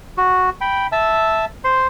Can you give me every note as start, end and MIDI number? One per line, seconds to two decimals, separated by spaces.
0.18 0.50 66
0.61 0.87 79
0.61 0.87 83
0.92 1.45 76
0.92 1.45 81
0.92 1.45 88
1.64 1.87 72
1.64 1.87 84